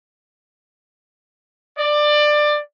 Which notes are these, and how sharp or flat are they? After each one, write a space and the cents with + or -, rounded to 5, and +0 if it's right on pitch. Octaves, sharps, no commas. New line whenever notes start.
D5 +20